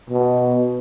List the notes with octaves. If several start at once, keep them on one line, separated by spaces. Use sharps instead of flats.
B2